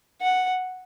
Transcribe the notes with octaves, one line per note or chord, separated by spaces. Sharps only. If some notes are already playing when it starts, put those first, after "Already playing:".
F#5